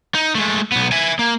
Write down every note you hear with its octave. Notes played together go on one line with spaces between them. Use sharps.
D#4
G#3 A3
B1 B3
E5 G#5
A#3